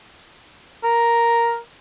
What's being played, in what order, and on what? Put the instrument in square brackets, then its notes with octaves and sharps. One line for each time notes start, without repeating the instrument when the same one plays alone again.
[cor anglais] A#4